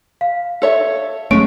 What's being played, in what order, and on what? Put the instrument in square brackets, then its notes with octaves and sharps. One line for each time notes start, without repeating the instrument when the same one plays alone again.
[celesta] F5
[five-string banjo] A4 C#5 E5
[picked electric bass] F#3 G#3 A3 [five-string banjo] C#4 [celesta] D7